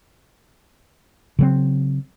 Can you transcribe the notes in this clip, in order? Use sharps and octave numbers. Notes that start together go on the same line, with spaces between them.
C#3 F#3 C4